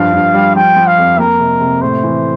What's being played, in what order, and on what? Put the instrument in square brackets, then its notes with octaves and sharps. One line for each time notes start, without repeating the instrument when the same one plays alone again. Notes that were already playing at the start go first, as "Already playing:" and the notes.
Already playing: [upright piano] G2 F3 [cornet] F5
[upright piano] G2
G3
[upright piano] F3 [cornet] G5
[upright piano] F3
[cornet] F5
[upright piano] F2
[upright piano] A#3 [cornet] A#4
[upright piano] C3
C3
[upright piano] A2 [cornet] C5
[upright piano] E3